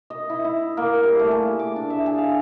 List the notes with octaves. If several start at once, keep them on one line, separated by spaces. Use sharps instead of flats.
D#5
E4
E4
A#3
G3
A3
G#4
D6
D4
E5
G#4
F5